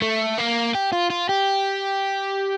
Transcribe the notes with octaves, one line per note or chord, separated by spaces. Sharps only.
A3
A#3
G4
F4
F4
G4